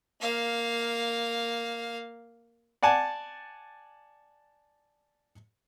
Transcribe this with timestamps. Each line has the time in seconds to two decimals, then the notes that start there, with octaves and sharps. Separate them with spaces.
0.21 A#3 F5
2.83 D5 F#5 G#5 A5